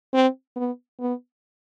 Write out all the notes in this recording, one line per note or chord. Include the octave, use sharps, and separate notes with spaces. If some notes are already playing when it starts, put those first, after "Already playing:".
C4
B3
B3